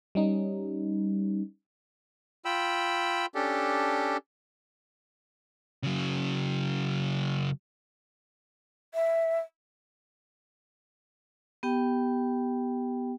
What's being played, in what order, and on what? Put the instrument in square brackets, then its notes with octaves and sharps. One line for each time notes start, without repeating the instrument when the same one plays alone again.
[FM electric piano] G3 C#4 D#4
[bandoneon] F4 G5 B5 E6
C#4 D4 G4 A4
[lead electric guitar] C#3 F#3
[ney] E5
[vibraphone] B3 G4 G5